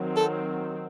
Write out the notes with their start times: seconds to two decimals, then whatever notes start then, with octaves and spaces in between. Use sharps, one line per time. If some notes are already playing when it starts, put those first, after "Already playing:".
Already playing: D#3 F#3 C4
0.17 A4